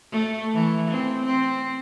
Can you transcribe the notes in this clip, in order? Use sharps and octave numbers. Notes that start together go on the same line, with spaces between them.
A3
E3
C4
C4